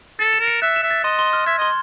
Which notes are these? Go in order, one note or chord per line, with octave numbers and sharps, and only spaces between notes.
A4 A6
E7
A#4
C#7
E5 F#6
E7
E5
A6
D#5 C6
C6
F6
E5 G#6
D#5 C6